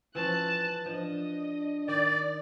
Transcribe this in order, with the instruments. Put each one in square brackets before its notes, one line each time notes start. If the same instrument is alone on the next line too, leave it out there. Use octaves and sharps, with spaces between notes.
[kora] E3 F3 C#4 [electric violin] A5 F#6
[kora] F3 [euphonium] D4 [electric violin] D#5
[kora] D#3 [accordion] D5